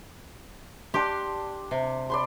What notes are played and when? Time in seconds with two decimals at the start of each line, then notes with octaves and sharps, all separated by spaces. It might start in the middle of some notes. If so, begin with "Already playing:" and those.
0.94 D4 G4 C6
1.71 C3
2.10 D5 B5 C6